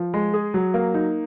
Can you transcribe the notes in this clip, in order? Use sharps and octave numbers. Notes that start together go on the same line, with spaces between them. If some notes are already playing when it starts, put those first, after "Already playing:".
Already playing: F3
G#3
G#4
F#3
A#3
D#4